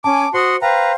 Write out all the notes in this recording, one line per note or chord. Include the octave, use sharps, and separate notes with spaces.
C#4 G#5 A5 D6
F#4 C5 F#5 C6 D#6
B4 C5 F5 G5 A#5